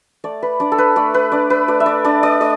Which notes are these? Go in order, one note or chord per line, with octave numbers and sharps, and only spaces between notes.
A3 D5
B4
D4 D5
A4
B4
A3 D5
B4
D4 D5
B4
A3 D5
E5
D5
D4 D5
D5
A3 D5